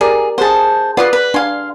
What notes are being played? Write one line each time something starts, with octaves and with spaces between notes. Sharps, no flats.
G4 G#4 A#4 D5
G#4 C5 F#5 A5
F4 B4 D5 F5 F#5 D#6
B4 D5
D4 F5 G#5 A#5 C6